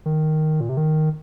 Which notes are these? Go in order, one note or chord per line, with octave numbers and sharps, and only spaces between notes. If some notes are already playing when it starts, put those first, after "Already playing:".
D#3
A#2
C3
D#3